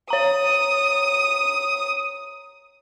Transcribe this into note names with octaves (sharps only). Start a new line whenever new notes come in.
C#5 A#5 D#6